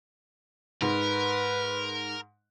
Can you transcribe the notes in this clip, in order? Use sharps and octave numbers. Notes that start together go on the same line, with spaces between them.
G#2 A#4 B4